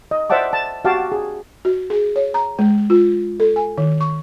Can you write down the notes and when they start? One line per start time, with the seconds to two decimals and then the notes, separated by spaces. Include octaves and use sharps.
0.11 D#5
0.30 C5 D5 E5 F#5 A5 D6
0.53 A5
0.85 F#4 G4 F5 G5 A5 D6
1.12 G#4
1.65 F#4
1.90 G#4
2.16 C#5
2.34 A#5
2.59 G#3
2.90 F4
3.40 A4
3.56 G#5
3.78 D#3
4.01 C#6